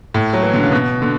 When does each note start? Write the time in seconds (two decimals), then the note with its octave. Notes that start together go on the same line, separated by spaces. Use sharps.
0.14 A2
0.33 F#3
0.43 E3
0.54 D3
0.63 C#3
0.72 B2
1.02 D3